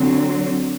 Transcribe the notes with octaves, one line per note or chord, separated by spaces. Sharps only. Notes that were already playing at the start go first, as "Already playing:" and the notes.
Already playing: D3 F#3 C4